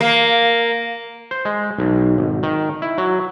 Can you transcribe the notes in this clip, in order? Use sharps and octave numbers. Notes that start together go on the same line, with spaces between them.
A#3
C5
G#3
B1
G#1
D#3
E4
F#3